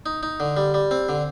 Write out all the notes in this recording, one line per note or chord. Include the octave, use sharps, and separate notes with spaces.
D#4
D#4
D3
G3
G3
C4
D3